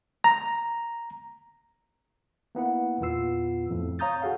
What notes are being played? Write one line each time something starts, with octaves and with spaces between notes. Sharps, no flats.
A#5
A#3 B3 E4 F#5
E2 A#2 B3 F4 E6 C7
F2 A2
C#5 F5 A#5 D#6 G6 A6
F#4 G#4 A4 F5 F#5